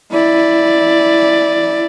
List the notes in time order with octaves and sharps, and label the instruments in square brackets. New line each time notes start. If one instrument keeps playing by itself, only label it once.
[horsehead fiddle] E4 D5